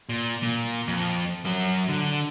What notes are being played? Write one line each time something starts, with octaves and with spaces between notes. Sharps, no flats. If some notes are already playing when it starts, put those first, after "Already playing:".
A#2
A#2
F2
F#2 F#3
D3